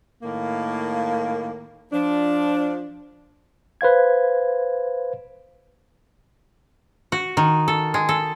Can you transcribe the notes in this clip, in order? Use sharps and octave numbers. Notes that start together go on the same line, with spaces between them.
A2 D#3 A#3
F3 D4
B4 C5 F5 G#6
F#4
D#3
A4
G#3
A4